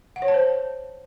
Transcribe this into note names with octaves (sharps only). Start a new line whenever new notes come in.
F#5
C#5
A5
C5